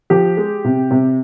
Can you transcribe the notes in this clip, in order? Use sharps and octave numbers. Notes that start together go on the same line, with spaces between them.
F3 G4
G#3
C3
C3